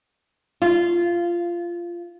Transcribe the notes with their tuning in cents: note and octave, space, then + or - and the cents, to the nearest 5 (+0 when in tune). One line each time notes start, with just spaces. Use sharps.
F4 -15